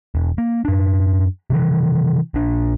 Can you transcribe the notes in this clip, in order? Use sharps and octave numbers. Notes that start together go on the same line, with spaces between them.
E1
A#3
F#2 D4
C3 D#3 E3
A#1 D4